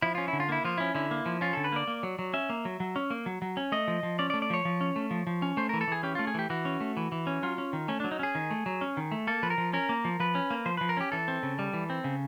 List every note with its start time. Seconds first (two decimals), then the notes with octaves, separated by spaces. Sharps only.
0.02 F3 E4
0.15 C#4 F4
0.28 E4
0.33 D3
0.40 F4
0.49 A#3 E4
0.65 F3 F4
0.78 C#4 E4
0.95 D3 E4
1.11 A#3
1.26 F3
1.41 C#4 F4
1.53 D3 A4
1.64 B4
1.72 A#3 D5
1.87 A#3
2.03 F#3
2.19 F#3
2.33 C#4 E5
2.50 A#3
2.65 F#3
2.80 F#3
2.96 C#4
3.10 A#3
3.26 F#3
3.42 F#3
3.57 C#4
3.72 A3 D#5
3.88 F3
4.03 F3
4.19 C#4 D5
4.30 D5
4.34 A3
4.42 D5
4.50 F3 C#5
4.65 F3
4.81 C#4
4.96 A3
5.11 F3
5.27 F3
5.42 C#4
5.57 A3 C5
5.69 E3 A#4
5.81 A4
5.88 E3 G#4
6.03 C#4 G4
6.15 A3 F4
6.27 G#4
6.34 E3 G4
6.50 E3 F#4
6.65 C#4
6.80 A3
6.97 E3
7.12 E3
7.27 C#4
7.43 F#3 F4
7.58 C#4
7.73 D#3
7.88 A3 C#4
8.00 F#3 D4
8.11 D#4
8.19 C#4 G#4
8.35 D#3
8.51 A3
8.66 F#3
8.81 C#4
8.97 D#3
9.12 A3
9.27 A#3 A4
9.43 F3 B4
9.50 A#4
9.58 F3
9.73 C#4 A#4
9.89 A#3
10.05 F3
10.20 F3 B4
10.35 C#4
10.50 A#3
10.66 F3 C5
10.77 F3 B4
10.89 A#4
10.97 C#4 G4
11.12 E3 A4
11.28 C4
11.43 C#3
11.59 G3
11.74 E3
11.90 C4
12.04 C#3